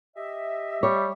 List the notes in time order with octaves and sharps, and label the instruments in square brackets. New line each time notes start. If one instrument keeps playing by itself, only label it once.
[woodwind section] G4 D#5 E5
[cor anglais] G3 [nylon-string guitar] C#5